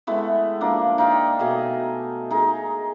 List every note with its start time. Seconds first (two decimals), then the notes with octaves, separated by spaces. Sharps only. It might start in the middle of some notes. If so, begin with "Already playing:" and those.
0.07 G#3 A3 B3 E4
0.61 F3 A#3 D4
0.98 D#4 D5 F5 G5
1.39 B2 A3 D#5 G#5
2.31 D#4 G#4 A#4